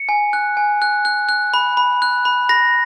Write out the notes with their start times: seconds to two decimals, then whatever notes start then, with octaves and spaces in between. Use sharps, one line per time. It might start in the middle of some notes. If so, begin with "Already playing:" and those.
Already playing: C#7
0.09 G#5
0.33 F#6
0.57 G#5
0.82 F#6
1.05 F#6
1.29 F#6
1.54 B5
1.77 B5
2.02 F#6
2.25 B5
2.49 B5 A#6